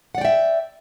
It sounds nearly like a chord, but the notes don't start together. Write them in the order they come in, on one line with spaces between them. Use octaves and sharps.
F#5 D5 G5 E5